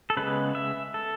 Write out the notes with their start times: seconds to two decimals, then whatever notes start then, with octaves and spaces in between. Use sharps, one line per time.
0.10 A4
0.17 C#3 G#3 B3 B4
0.55 E5
0.94 A4